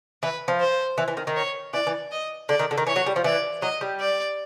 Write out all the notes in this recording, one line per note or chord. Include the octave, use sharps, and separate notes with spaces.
E3 B4
F3
C5
E3
E3
D#3
D#3
C#5
E3 D5
E3
D#5
D3 D5
D#3
D3
D#3
E3 C#5
F#3
G3
F3
E3 D5
F#3 D#5
G3
D5